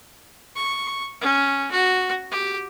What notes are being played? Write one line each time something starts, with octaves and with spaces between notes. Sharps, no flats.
C#6
C#4
F#4
G4